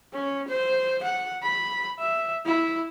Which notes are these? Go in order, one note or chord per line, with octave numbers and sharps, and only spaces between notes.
C#4
C5
F#5
B5
E5
E4